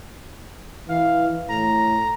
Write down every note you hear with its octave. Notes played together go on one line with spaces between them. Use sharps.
E3 F5
A2 A#5